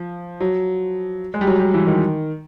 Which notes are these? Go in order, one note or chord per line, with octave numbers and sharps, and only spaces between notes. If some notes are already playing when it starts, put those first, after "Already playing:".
Already playing: F3
F#3
G#3
G3
F#3
G3
E3
D#3